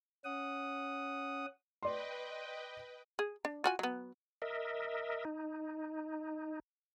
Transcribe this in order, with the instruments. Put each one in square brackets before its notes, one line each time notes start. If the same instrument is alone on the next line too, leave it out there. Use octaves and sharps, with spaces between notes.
[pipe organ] C#4 F#5 D#6
[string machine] B4 D#5 G5 [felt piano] D5 C6
[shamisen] G#4
D4
F4 F#4 G#5
F#3 B3
[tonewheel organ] A#4 D#5 E5
D#4